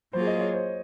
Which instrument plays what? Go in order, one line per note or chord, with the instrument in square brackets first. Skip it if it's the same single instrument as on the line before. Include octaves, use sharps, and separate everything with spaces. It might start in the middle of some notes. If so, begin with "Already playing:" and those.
[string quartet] F#3 A#3 F4 G#4 [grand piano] C5
[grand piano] D#5
C#5
C5